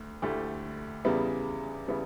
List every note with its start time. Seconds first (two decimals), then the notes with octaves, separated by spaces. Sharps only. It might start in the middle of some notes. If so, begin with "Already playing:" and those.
Already playing: D2 A3
0.22 D2 D3 A3 E4 G4
1.05 E2 C#3 G3 B3 E4
1.88 C#3 G3 B3 E4